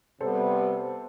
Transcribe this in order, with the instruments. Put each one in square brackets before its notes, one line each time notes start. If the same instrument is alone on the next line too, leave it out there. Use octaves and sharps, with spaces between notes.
[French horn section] C3 G3 B3 [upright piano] A4 C5